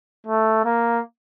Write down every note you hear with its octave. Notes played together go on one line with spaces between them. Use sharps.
A3
A#3